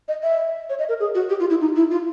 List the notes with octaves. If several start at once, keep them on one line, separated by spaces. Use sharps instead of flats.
D#5
E5
C#5
D#5
A#4
G#4
F#4
G4
F4
E4
D#4
E4
F4